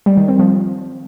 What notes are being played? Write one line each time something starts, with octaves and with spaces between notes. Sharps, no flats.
G3
D#3
C4
F3